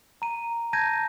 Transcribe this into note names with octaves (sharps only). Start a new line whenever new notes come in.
A#5 D#7
A5 G6 G#6 A#6 D#7